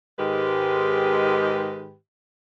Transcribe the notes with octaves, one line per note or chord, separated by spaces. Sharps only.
G#2 D#3 G#3 G4 B4